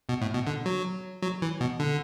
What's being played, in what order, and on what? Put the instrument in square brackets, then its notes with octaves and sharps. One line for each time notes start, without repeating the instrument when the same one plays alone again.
[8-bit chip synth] B2
A2
B2
D3
F#3
F#3
E3
B2
D3